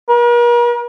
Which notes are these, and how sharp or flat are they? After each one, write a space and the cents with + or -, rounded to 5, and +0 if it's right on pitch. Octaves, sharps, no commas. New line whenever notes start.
A#4 +45